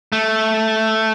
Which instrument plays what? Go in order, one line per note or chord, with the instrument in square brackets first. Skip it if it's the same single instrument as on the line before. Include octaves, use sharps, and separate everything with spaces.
[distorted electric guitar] A3